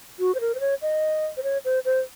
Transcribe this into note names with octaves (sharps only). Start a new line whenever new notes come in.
F#4
C5
A#4
C5
C#5
D#5
C5
C#5
C5
C5